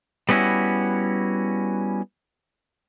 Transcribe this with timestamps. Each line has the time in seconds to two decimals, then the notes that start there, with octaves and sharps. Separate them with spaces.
0.29 G3 B3 C#4 D#4 E4 F#4